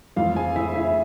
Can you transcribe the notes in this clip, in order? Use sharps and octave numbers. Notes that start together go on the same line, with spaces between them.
F2 E3 A3 F4 F5
G#4 G#5
E4 E5
E4 E5